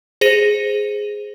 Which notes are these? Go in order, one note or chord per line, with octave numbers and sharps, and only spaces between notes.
G#4 C5 A#6 D#7